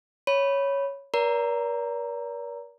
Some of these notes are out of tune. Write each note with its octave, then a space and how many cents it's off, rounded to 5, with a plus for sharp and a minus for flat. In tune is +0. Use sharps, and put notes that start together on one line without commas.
C#5 +0 B5 -5
A#4 +40 D5 -45 A#5 +0